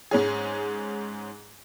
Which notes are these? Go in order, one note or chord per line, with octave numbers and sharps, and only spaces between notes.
G#2 G#3 C#4 G#4